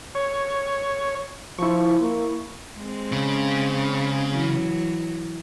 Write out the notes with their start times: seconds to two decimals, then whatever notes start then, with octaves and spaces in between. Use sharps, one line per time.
0.15 C#5
1.58 F3 E4 C#6
2.00 A#3
2.76 G#3 C4
3.12 C#3
4.33 E3 F#3